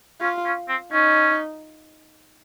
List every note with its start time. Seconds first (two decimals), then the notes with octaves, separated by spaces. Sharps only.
0.21 C#4 F4
0.45 C#4
0.68 C4
0.92 C#4 D#4